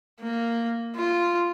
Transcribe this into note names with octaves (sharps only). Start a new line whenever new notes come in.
A#3
F4